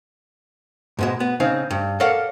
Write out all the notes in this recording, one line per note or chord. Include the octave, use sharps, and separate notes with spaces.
G#2 B2 G#3
B3
C#3 C4 D#4 F5
G2
A4 A#4 C#5 D5 F5 F#5